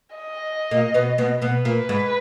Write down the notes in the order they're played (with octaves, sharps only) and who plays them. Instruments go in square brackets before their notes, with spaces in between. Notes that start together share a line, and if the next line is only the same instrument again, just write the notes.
[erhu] D#5
[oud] A#2 A#3
B2 B3
B2 B3
[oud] B2 B3 [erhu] B4
[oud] A#2 A#3
G#2 G#3